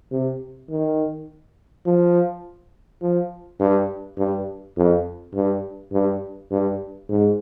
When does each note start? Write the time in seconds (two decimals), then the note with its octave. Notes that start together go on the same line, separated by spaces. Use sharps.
0.12 C3
0.70 D#3
1.86 F3
3.02 F3
3.60 G2
4.18 G2
4.77 F2
5.34 G2
5.92 G2
6.51 G2
7.09 G#2